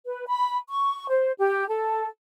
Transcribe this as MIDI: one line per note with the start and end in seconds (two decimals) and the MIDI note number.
0.04 0.24 71
0.26 0.58 83
0.68 1.07 85
1.09 1.32 72
1.38 1.67 67
1.68 2.07 69